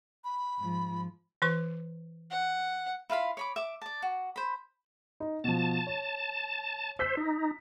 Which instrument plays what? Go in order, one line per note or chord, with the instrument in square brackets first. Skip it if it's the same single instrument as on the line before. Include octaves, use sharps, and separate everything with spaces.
[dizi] B5
[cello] G#2 F3
[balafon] E3 B4 C#6
[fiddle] F#5
[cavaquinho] E4 F4 F5 B5
C#5 B5 D6
E5 D6
D5 A5
F#4
C5 B5
[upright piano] D#4
[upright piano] B2 F3 [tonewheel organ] A5
[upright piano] C#5
[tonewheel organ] C5 [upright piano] E6 B6
[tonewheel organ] D#4